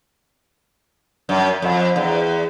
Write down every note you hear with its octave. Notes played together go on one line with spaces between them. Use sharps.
F#2
F2
E2